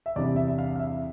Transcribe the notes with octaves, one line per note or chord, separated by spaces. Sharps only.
E5
E2 C3 G3 D4 D5
E5
E5
F5
F5
E5